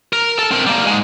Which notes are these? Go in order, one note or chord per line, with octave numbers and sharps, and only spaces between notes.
A#4
A4 A5
C4 A#4
G3 A#3
G#2 G#3